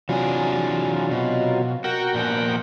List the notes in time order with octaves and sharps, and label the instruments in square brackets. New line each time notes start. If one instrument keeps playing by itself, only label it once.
[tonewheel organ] C3 F#3 F4 [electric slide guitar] E3 D4 G#4
[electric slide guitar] B2
[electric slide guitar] F#4 [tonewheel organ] A#4 F#5 G5
[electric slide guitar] A#2 F3 B3